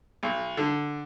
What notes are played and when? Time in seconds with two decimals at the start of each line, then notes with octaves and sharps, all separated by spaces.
0.23 B1
0.57 D3